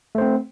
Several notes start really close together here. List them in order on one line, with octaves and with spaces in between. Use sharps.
A3 C5 C4